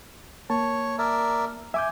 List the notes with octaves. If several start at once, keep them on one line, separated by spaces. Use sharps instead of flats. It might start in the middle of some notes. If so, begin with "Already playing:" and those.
A#3 C#5 A5
A#4 D5 E5
E5 G#5 D6 G6